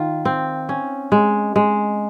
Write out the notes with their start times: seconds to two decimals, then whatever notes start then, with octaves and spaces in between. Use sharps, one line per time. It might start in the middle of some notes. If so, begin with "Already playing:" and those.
Already playing: D#3 F4
0.25 C4
0.69 C#4
1.12 G#3
1.56 G#3